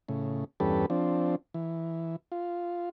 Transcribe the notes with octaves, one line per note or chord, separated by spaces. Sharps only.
A2 C#3
E2 G2 C#4 G4 A4 B4
F3 C4 D4
E3
F4